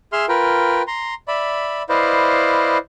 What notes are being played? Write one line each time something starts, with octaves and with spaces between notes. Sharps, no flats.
G#4 E5 C6 F6
F4 A#4 B4 G5
A#5 C6
D5 E5 B5
E4 B4 C5 D5 D#5 F5